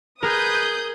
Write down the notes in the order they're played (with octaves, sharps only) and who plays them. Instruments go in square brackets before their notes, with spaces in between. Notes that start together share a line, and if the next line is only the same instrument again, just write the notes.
[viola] G#4 [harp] A#4 [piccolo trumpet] B4 [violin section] D#6 G6